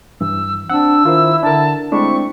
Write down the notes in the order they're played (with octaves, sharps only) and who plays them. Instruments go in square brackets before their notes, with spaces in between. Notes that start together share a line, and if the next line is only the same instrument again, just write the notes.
[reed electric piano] G2 E3 [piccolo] E6
[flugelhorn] C4 [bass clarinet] D4 [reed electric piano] F#5 [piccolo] E6
[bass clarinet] D#3 [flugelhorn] E4 [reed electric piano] F4 A#4 C5
[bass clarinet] D3 [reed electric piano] D4 A#4 [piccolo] A5
[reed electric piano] G#3 A3 D4 [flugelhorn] C4 [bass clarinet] E4 [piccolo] C#6